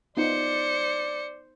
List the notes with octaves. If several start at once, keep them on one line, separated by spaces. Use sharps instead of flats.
B3 D#4 F4 C5 D5 C#7